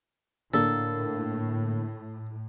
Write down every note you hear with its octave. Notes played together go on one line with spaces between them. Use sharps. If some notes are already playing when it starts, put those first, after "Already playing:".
A2 D3 A#3 A4